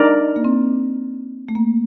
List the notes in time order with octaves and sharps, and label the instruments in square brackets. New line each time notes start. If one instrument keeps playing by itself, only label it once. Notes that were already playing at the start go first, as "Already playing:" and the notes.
Already playing: [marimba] D4 [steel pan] D#4 A#4 D5
[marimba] A#3
C4
A3
A#3